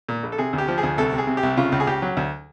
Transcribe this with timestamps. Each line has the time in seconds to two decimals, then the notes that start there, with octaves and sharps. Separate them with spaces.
0.09 A#2
0.23 A#1
0.32 A4
0.38 C3 G#4
0.53 D2
0.58 G4
0.68 F3
0.78 G#4
0.83 D2
0.98 C2 A4
1.13 C3
1.18 G#4
1.27 C3
1.37 G4
1.43 C2
1.57 C#3 F4
1.72 C#2
1.80 G#4
1.87 C#2 G4
2.02 F#3
2.17 D2